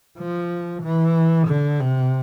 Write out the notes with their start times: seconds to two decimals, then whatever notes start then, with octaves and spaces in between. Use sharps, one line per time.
0.18 F3
0.83 E3
1.48 D3
1.80 C3